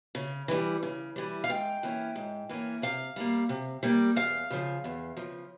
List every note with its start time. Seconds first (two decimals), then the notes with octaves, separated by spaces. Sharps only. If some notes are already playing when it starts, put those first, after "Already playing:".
0.15 C#3
0.48 E3 G3
0.83 C#3
1.16 E3 G3
1.44 F5
1.49 G#2 G5
1.83 E3 A#3 C#4
2.16 G#2
2.49 E3 A#3 C#4
2.82 C3 F5
3.16 G3 A#3
3.49 C3
3.83 G3 A#3
4.16 E2 F5
4.51 C#3 F3
4.84 E2
5.17 C#3 F3